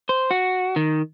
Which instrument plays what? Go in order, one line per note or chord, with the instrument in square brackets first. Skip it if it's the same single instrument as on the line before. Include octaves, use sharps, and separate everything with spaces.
[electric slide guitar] C5
F#4
D#3